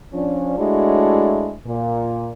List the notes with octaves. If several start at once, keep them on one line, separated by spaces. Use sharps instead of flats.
F3 C#4 D4
G#3 A3 D4 E4 F#4 C#5
A#2